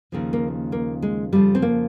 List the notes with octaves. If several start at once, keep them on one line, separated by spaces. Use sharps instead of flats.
D#2 C#3 F3
A#3
A#3
G#3
F2 C#3 F3 G3
C4
A#3